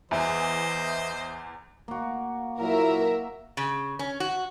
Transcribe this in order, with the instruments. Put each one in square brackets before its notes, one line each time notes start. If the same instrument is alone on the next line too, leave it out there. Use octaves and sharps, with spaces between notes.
[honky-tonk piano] E2 [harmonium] E3 [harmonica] C5 D#5 [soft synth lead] E5
[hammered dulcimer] A#3 F#4
[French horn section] A#2 F#3 E4 [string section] A#4 E5
[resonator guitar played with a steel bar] C#3
C#4
F#4